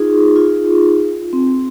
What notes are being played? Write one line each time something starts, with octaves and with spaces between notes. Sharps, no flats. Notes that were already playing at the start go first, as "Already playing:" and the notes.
Already playing: D#4 F4 G#4
F4
C4